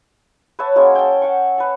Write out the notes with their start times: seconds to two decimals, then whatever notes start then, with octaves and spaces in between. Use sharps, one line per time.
0.59 B4 C#5 E5 A5
0.76 F#3 G#3 A#3 C#4
0.95 G5 A5
1.22 F#5 C#6
1.58 B4 A5